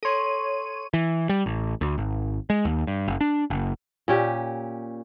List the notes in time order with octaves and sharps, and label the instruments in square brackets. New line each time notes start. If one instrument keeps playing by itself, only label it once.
[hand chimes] A4 C6 [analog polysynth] C#5 D#7
[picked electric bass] E3
G3
A1
D2
G#1
G#3
D#2
G2
F#1
D4
F#1
[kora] A#2 C#4 G4